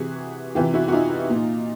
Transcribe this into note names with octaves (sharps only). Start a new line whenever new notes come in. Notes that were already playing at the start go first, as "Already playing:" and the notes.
Already playing: C3 E3 F#4 G#4
C3 E3 F4 G4
E4 F#4
F#4
D#4 F4
A#2